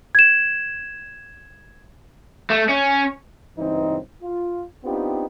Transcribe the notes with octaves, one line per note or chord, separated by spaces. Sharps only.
G#6 E7
A3
C#4
C#2 G2 E3 C4 D#4
F4
B3 C4 D4 D#4 F4 G4